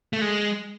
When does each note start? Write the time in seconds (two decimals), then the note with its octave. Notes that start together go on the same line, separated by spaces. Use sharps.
0.13 A3
0.21 G#3